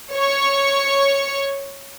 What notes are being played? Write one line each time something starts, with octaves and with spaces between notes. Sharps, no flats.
C#5 C#6